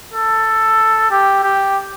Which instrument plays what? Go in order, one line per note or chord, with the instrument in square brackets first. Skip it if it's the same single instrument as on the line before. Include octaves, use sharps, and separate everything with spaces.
[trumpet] A4
G4
G4